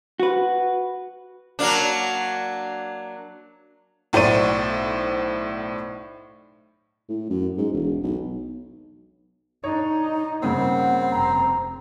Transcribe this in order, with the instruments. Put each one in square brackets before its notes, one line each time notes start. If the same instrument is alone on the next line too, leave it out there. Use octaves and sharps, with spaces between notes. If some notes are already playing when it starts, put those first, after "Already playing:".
[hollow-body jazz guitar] F#4 B4
[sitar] F#3 A#3 D4
[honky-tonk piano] B1 A2 C5 D5 D#7
[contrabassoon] A2
F#2
G#2
E1
B1
[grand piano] D4 C#5 [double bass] D#4
[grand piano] G2 C#3 C#4 [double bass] A#3 [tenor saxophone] C4 [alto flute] F#5
[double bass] F1 [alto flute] A#5